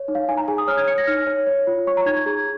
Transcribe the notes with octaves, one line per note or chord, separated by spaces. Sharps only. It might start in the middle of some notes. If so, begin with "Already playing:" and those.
Already playing: C#5
D#4
F5
D#4 G#5
A#5
G#4 G#5
D#6
C#5 F6
G#6
C#5 C#7
A#6
D#4 F6
C#5
C#5
F4
C#5 C#6
A#5
D#4 G#6
G#6
G#4